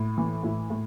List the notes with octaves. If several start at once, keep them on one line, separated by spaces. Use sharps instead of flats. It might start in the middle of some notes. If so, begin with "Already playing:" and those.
Already playing: A2
E3
A2 E4
A2